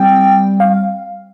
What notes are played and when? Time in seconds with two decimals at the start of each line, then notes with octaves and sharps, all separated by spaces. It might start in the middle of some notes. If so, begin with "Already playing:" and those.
Already playing: G3 C4 G5
0.60 F5